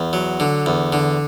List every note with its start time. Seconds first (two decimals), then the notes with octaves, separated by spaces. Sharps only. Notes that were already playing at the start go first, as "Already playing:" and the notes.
Already playing: E2
0.13 F#3
0.40 D3
0.66 E2
0.93 D3